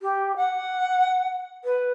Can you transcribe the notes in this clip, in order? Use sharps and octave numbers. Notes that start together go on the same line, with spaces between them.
G4
F#5
B4